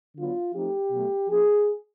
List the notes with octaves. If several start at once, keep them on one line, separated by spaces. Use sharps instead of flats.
D3 F#3 B3 D4 F4
F3 A3 C4 D#4 G4
B2 F#3 A3
F3 A#3 C#4 G#4